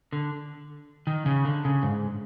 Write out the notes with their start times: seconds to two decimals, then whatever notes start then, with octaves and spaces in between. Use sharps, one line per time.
0.13 D3
1.07 D#3
1.26 C#3
1.45 D3
1.65 C#3
1.83 G#2